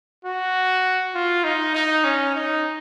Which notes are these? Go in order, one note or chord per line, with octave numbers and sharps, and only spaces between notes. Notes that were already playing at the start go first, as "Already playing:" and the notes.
F#4
F4
D#4
D#4
C#4
D#4